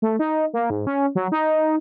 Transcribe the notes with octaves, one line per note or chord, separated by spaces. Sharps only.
A3
D#4
A#3
G#2
C#4
F#3
D#4